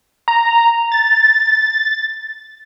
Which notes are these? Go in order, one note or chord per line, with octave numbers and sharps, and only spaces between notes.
A#5
A6